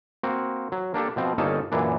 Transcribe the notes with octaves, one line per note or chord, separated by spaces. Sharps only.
A#3 C4 F#4
F#3
A#3 D4 G4 A4
B2 F3 C4
G1 A#3 C#4 D#4 A4 A5
F#2 A#2 E3 D4